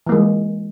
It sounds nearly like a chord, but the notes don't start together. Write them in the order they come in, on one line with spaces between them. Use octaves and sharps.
E3 A#3 G#3